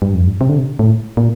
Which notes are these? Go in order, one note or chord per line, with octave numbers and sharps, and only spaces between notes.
G2
F2
G2
C3
D3
C3
A2
A#2